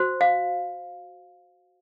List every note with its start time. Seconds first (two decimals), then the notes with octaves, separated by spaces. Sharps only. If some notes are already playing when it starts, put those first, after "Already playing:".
Already playing: F#4 C5
0.21 F5